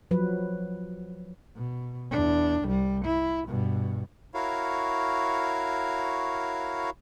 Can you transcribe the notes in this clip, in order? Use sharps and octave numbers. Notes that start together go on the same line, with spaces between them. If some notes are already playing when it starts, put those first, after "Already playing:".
F3 F#3 B4
B2
E2 D4
C2 G3
E4
G2 B2
E4 F#4 A#4 C#5 F5